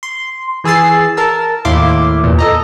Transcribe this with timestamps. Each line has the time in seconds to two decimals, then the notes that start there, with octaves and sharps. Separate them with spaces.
0.03 C6
0.64 E3 G#4 E6 A6 C7
1.17 A#4 A5 E6
1.65 D#2 A2 E4 F5 C6 D6
2.23 E2 A#2
2.39 A4 D#5 A#5